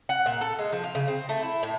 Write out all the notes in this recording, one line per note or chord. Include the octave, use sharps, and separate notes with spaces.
F#5
A#2
A4
G#3
F3
F4
C#3
C4
A3
E4
A2